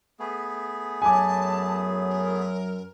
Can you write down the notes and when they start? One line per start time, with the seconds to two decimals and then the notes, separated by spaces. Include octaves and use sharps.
0.20 A3 B3 G#4
1.02 F#2 F#3 G#5 A5 D6
2.09 A#4